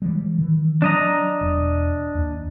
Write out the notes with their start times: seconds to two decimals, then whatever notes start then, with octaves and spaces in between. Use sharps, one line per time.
0.02 E3 G3 G#3
0.38 D#3 E3
0.82 F#3 D4 D#5 A#5
1.41 E1
2.15 D#2